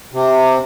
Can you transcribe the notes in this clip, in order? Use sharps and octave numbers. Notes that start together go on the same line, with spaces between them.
C3